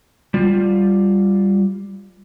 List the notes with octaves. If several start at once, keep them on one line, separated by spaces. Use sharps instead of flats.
G3 F4